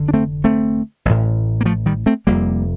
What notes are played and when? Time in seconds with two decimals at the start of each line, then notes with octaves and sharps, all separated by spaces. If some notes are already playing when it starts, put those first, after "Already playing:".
Already playing: F1 D3
0.08 D4
0.14 A3 C4
0.44 A3 C4
1.05 A1 A2
1.61 A#3
1.65 F3 A3
1.86 D#3 G3
2.06 A3 C4
2.27 F1 F2 C3 G3 A#3